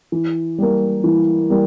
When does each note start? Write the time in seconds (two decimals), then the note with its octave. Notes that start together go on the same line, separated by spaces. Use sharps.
0.12 E3
0.58 G3 A#3
1.04 E3
1.50 G3 A#3